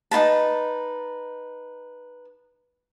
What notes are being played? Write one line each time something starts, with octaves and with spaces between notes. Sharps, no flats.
D#4 F4 B4 A5